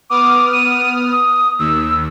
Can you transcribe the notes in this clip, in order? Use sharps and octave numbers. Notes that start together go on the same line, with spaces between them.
B3 D6 D#6 F6
D#7
D#6
D#2 E6